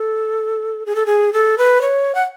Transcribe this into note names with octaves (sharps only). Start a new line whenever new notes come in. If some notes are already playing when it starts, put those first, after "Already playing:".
Already playing: A4
G#4
A4
G#4
A4
B4
C#5
F#5